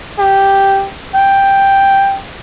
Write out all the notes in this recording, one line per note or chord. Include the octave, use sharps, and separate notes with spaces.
G4
G5